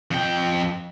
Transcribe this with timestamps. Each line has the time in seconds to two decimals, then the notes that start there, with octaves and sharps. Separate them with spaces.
0.11 F2 G5